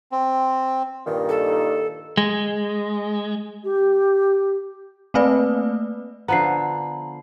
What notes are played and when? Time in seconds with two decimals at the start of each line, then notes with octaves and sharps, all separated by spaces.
0.12 C4
1.06 G2 A#2 D#3
1.29 A4
2.17 G#3
3.63 G4
5.14 A3 A#3 C4 B4 D5
6.28 D3 F3 B3 A#5 C7